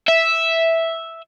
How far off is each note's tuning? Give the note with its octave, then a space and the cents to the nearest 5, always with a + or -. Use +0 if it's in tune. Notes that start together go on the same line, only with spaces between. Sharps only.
E5 -5